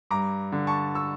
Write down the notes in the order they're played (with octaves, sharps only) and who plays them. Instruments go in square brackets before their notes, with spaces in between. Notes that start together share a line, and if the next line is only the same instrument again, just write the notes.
[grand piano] G2 A#5 D6
D3
A5 C#6
C#6 E6